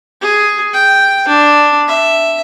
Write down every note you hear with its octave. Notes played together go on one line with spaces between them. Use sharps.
G#4
G5
D4
E5